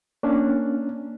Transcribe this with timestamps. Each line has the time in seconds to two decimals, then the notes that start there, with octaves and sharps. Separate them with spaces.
0.23 A#3 C#4 D4